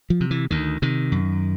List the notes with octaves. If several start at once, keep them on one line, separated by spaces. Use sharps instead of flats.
F3
C3
E3
D2 D#3
C3 D#3
F#2